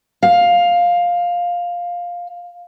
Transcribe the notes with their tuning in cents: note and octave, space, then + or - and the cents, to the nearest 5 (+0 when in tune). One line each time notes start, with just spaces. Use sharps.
F5 +10